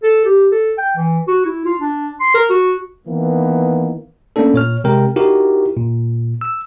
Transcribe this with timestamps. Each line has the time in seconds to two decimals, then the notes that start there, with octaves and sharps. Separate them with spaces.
0.03 A4
0.25 G4
0.52 A4
0.78 G5
0.97 E3
1.28 F#4
1.45 E4
1.65 F4
1.80 D4
2.20 C6
2.34 A#4
2.50 F#4
3.08 D#3 E3 A#3 B3
4.36 A3 A#3 C#4 D4 A4
4.54 A#2 C#5 F6
4.84 C3 G#3 A#4 G5
5.16 D#4 E4 F#4 G4 A#4
5.77 A#2
6.41 E6